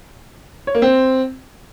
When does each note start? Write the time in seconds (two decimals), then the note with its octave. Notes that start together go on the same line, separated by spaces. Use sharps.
0.67 C#5
0.75 A#3
0.82 C4